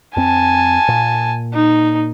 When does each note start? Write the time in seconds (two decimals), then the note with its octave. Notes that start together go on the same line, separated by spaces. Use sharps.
0.17 F2 C4 G#5 A5
0.88 A#2
1.54 D#4